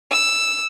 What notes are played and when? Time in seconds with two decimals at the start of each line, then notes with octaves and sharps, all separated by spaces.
0.12 E6